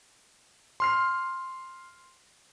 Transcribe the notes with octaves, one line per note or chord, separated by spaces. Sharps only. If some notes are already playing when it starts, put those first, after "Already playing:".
C6 F6 C7